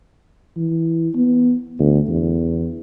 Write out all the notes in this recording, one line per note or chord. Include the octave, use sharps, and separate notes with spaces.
E3
B3
D2
E2